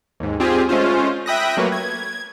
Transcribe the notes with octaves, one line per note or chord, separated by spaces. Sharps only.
D#2 G#2
G3 C4 F4 G4 G#4
G#3 A3 C#4 F4 C5
E5 G5 B5 D#6 F#6 A#6
F#3 A3 A#3 F#4 A#4 B4
G#6